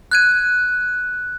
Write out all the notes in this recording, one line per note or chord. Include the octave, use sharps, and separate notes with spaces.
F#6 G#6 D#7